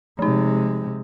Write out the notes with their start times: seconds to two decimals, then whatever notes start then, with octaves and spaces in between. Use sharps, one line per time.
0.19 C3 F3 G#3 D#4